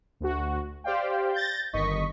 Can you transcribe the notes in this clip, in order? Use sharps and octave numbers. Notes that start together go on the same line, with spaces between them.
D2 F#4
G4 C5 D5 F5 G5
G6 A6 A#6
G1 D#3 D#5 C#6 B6